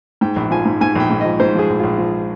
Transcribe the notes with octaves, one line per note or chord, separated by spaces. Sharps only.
G#2 G5
A#1
F3 G#5
G#2
G#2 G#5
A#1 G5
G#2
F3 D#5
G#2 C5
F3 G#4
A#1
A#1 F4
F3